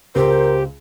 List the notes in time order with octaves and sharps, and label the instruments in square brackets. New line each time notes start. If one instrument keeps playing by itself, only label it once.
[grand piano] C#2 [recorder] G4 [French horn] A#4 [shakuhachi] C5